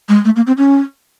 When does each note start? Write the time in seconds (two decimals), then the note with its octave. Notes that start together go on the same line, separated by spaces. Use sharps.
0.09 G#3
0.25 A3
0.36 A#3
0.47 C4
0.58 C#4